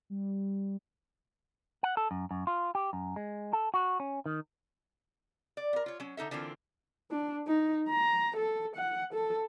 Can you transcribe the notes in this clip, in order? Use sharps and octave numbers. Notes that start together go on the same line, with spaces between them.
G3
F#5
A4
F#2
F#2
F4
G4
F#2
G#3
A4
F#4
C#4
D#3
D5
B3 A#4
F4 C#5
F#3 C#4
D3 D#4 A4 E5
D3 E3 A#3 C4 F4
D4
D#4
A#5
A4
F#5
A4